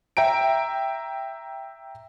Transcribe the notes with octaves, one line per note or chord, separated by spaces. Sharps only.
E5 G5 A#5 D7